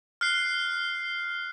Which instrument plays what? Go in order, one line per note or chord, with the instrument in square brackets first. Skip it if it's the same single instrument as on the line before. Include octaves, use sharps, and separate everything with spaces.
[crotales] F6 F#6 C7